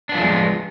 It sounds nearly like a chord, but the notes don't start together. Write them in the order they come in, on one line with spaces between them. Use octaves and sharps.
D4 B3 F3 F#3 G#3